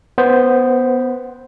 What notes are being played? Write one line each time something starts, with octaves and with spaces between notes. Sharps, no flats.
B3 C5